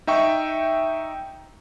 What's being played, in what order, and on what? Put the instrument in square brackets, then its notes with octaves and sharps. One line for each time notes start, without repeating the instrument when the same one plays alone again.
[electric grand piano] D#4 E5 G5 C#6